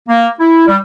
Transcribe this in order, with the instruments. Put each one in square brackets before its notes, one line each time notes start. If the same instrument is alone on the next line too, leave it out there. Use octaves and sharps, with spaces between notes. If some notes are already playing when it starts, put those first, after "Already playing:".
[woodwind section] A#3
E4
G3